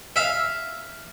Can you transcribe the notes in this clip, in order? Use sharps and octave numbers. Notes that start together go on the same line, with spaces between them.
E5 F5